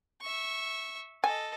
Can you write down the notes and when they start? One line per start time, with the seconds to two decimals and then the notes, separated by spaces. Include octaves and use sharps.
0.21 E5 C#6
1.24 A4 D#5 G#5